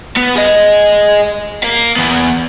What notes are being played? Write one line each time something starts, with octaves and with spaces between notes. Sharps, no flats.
B3
G#4 D#5
A#4 F5
E3 B3